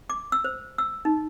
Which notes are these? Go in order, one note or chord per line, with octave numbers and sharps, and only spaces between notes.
D6
E6
C5
E6
D#4